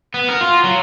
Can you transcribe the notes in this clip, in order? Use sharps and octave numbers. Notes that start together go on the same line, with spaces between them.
B3
A#4
F4
F#3